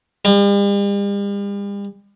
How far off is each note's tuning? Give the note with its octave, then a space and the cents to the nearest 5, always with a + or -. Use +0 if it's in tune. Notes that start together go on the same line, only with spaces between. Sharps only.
G3 +45